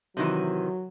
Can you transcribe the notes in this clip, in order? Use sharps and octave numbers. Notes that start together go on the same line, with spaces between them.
C3 D#3 E3 F#3